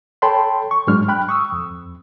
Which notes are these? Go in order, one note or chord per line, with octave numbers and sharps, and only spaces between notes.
A4 C#5 G5 A5 B5 C6
C#6
G#2 F#3 G#3 D4 F6
G5 B5 F#6
C#6 D#6 E6
F2